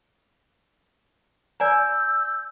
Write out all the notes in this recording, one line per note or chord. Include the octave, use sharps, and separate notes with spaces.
D5 G#5 A#5 E6 G6